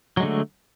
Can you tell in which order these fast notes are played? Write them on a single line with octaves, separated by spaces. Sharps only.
F#3 G#3 D3 A3